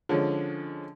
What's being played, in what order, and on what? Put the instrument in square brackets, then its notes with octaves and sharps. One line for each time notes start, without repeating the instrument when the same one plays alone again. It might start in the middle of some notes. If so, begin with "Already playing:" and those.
[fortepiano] D3 F3 G#3 C#4